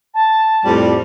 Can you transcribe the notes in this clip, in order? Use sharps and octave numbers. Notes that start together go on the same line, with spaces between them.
A5
F2 A2 G3